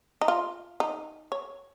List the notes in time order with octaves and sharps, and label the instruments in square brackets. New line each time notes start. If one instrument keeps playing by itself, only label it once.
[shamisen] D#4
F4
D#4
C#5